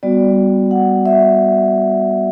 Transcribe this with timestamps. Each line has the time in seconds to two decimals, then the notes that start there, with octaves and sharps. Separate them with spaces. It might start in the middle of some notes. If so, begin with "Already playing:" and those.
0.03 G3 B3 F#4 D5
0.71 F#5
1.06 E5